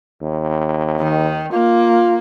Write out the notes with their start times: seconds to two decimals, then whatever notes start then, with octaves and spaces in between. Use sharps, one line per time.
0.22 D#2
1.00 D#3
1.53 A#3 F4